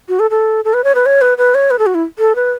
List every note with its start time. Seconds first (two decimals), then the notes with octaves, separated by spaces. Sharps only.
0.09 F#4
0.19 A4
0.30 A4
0.65 A4
0.74 B4
0.84 C#5
0.95 B4
1.06 C#5
1.21 B4
1.38 B4
1.55 C#5
1.71 B4
1.79 A4
1.86 F#4
1.95 E4
2.19 A4
2.35 B4